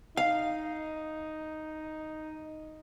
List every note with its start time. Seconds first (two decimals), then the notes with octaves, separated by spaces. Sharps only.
0.17 D#4 F5